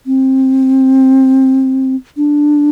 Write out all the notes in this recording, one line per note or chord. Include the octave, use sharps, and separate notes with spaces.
C4
D4